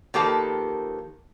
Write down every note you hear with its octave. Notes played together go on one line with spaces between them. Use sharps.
D#3 F3 A#3 G4 A4 B4